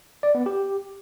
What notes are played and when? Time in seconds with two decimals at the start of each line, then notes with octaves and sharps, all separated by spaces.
0.23 D5
0.35 B3
0.46 G4